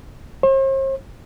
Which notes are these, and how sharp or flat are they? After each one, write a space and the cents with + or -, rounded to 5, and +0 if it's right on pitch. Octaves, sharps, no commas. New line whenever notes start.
C5 +45